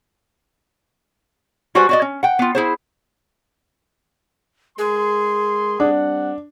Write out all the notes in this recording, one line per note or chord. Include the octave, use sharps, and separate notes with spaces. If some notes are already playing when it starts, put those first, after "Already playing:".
G3 F#4 B4 C5 D5 G#5
F#4 D5 D#5
C#4
F#5 G5
B3 F4
E4 G#4 C5
G#3 G#4 A#4 C6
G3 C4 D4 F#5